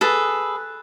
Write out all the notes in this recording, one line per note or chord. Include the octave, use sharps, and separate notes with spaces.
G#4 A4 B4